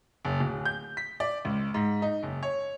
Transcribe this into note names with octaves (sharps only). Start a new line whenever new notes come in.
F#1
D1
G6
B6
D5
C#2
G#2
D#4
F#1
C#5